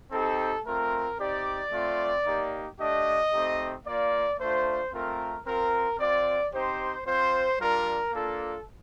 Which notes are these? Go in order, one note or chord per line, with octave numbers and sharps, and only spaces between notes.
C4 D#4 G4 A4
A3 C4 F4 A#4
C4 D#4 G4 D5
A3 C4 F4
A#3 D#4 G4
A3 D4 G4 D#5
A3 C4 D#4 G4
A#3 F4 D5
A3 D4 F4 C5
A3 C4 F4 A#4
C4 F4 A#4
C4 F4 D5
C4 D#4 G4 C5
C4 F4 C5
G3 D4 F4 A#4
A#3 D4 F4 A4